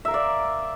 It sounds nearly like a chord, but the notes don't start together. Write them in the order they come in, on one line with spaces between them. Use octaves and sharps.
E5 A#4 F5 D5